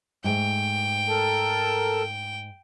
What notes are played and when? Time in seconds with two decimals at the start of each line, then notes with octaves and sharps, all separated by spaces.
0.24 G#2 A3 G5
1.09 A4 A#4 A5